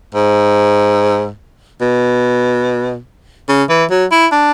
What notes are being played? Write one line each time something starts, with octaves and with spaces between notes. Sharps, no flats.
G#2
B2
C#3
E3
F#3
E4
D4